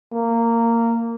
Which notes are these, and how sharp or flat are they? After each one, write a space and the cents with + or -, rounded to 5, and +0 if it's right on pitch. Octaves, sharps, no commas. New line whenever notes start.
A#3 -15